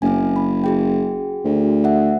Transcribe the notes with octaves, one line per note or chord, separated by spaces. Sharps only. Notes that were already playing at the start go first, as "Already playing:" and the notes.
F#1 C4 C#4 G#5
B5
F#4 G#4 G5
D2
E5 F#5